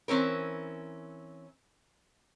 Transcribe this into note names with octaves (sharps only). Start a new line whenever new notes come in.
E3 C4 C#4 A#4